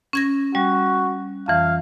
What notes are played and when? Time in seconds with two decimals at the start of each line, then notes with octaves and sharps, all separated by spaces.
0.13 C#4 G#6 A#6
0.55 G3 F#4
1.48 F2 E3 F5